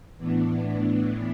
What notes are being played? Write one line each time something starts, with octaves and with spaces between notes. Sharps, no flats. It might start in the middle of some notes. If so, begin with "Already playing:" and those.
A2 E3 B3 D4